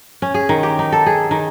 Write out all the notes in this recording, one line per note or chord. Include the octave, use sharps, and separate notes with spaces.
C#4
G#4
D#3
G4
D#4
A4
G#4
D#3